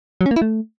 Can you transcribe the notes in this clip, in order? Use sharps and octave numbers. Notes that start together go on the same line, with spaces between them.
F#3
C#4
A#3
E4
A3